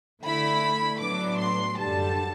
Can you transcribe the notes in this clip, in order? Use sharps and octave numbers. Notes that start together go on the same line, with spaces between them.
D3 A3 E4 B5
A2 F#3 B3 D4 D6
C6
F#2 D3 G3 A5